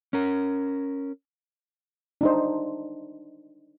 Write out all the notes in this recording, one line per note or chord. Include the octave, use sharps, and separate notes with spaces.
C#4 A#4
D4 D#4 C5